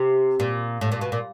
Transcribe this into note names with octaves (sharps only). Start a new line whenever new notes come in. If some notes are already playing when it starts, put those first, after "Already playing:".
Already playing: C3
A#2
A2
A#2
B2
A#2